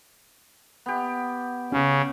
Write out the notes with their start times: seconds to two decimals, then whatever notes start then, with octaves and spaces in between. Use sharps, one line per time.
0.86 B3 G4
1.72 C#3 C#4